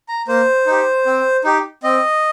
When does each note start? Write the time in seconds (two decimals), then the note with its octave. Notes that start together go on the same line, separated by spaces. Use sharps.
0.08 A#5
0.28 A#3 C5
0.66 D#4 G4
1.06 C4
1.44 D#4 G4
1.83 C4 D#5